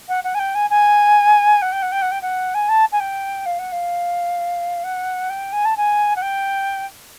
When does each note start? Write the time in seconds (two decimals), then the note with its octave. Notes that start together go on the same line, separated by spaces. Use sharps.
0.08 F#5
0.23 F#5
0.34 G#5
0.39 G5
0.54 G#5
0.70 G#5
1.62 F#5
1.72 G5
1.82 F#5
1.91 G5
2.01 F#5
2.11 G5
2.21 F#5
2.54 G#5
2.69 A5
2.92 G#5
3.00 G5
3.45 F5
3.59 F#5
3.72 F5
4.83 F#5
5.29 G5
5.52 G#5
5.65 A5
5.77 G#5
6.16 F#5
6.21 G5